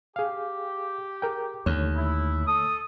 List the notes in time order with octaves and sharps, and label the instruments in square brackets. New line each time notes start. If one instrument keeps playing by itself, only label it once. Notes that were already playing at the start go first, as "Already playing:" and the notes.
[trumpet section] G4 [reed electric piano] G#4 F5
[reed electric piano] G#4 A#4 G5
[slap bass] D#2 [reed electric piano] D3 A3 C#5
[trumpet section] E4
[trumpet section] A4 [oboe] D#6